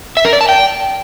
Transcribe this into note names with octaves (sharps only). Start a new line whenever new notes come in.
E5
A#4
D5
A5
G5